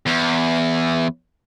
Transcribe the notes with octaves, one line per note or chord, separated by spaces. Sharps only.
E2